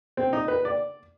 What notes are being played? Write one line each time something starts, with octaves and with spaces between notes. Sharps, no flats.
C4
D#4
B4
D5